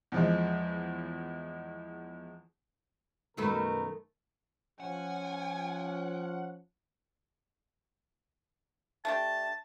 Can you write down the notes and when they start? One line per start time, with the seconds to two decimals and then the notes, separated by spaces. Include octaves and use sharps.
0.12 E2 F3 G#3
3.37 F#2 B2 D#3 A3 A#4 B4
4.80 F3 C#4 F#5 G#5
9.05 A3 D4 G4 A5